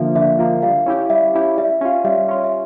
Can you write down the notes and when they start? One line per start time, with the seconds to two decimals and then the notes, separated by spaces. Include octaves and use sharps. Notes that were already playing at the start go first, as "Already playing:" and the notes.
Already playing: D3 F3 A#3 E5
0.15 D3 E5
0.39 F3 A#3
0.62 G3 F5
0.86 C#4 E4 G4
1.10 G3 E5
1.34 C#4 E4 G4
1.58 G3 E5
1.81 C#4 F4
2.04 G3 E5
2.29 C#4 F4
2.44 E5